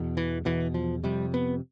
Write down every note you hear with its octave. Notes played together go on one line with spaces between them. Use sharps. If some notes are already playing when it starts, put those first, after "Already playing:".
Already playing: E2 B2
E3
E2 B2 E3
F3
F2 C3 G3
B3